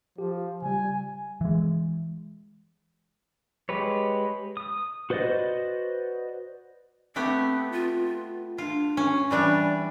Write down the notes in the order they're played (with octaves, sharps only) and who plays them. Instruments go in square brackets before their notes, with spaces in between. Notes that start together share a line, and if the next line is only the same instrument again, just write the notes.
[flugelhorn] F3 [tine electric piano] G4
[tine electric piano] C#3 G3 [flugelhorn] G#5
[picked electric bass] E3 G#3
[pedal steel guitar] G#3 G4 B4 C#5
D#6
F#4 B4 C5 D5 D#5
[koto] A3 B3 G4 [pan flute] C4
[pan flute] F4
[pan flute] D4 [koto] F4
[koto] C#4
[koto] E3 G3 D4 [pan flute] D5